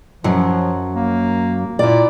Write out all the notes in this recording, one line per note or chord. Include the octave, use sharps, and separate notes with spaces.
F#2 F3 F#3
A#3
A#2 E4 D5